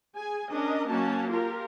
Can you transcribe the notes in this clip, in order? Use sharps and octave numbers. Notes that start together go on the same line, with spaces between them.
G#4 G#5
C#4 D4 A#4 D#5
F#3 A#3 C#4 F#4 A5
F4 G4 A#4